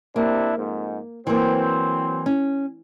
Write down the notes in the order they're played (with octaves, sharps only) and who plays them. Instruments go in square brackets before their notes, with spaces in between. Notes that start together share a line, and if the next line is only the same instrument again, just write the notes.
[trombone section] C3 D4 E4 [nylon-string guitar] A#3
[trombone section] F2 G#2
[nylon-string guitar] E3 A#3 [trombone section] F#3 C4
[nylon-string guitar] C#4